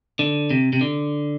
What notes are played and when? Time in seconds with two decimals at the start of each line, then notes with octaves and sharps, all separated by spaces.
0.19 D3
0.50 C3
0.73 C3
0.81 D3